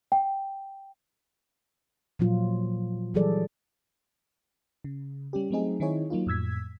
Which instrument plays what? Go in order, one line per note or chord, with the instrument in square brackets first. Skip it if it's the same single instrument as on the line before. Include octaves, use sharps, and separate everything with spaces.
[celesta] G5
[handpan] A#2 F3 F#3 F4
E3 F#3 G3 G#4 A4 D5
[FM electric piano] C#3
G3 C#4 G4
F#3 A3 C4 D#4 G#4
D#3 C4 D#4 E4 G#4 C#5
F#3 A#3 D#4 F4
F2 A2 E6 G#6 B6